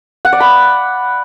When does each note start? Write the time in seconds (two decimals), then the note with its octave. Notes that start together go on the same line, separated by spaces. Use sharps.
0.25 F#5
0.33 D5
0.40 B5